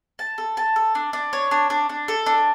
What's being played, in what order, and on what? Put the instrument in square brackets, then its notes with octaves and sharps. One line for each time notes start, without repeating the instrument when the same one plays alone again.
[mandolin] A5
A4
A5
A4
D4
D4
C#5
D4
D4
D4
A4
D4